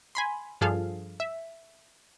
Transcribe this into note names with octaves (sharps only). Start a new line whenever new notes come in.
G#5 B5 C6
G2 F3 G#4 A4 F5
E5